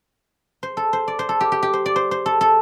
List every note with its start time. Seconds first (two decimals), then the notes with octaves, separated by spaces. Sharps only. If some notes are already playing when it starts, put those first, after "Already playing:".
0.63 C5
0.77 A4
0.93 C5
1.08 D5
1.19 C5
1.29 A4
1.41 G4
1.52 G4
1.63 G4
1.73 C5
1.86 D5
1.96 C5
2.11 C5
2.26 A4
2.41 A4